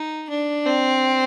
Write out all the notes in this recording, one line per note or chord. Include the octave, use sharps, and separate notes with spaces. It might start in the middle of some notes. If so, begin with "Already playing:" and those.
Already playing: D#4
D4
C4